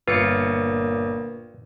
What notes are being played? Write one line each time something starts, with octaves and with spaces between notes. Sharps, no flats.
G1 A#2 F4 B4 C#7